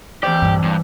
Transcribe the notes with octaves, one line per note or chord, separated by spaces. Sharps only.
E3 G4 C5 D5
A#1 G2
G2 E4